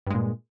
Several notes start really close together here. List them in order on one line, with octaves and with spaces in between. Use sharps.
G2 G#3 A#2